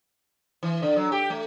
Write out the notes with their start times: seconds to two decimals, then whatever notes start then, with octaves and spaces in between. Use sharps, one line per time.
0.63 E3
0.82 D3
0.96 F#3
1.12 G4
1.30 A3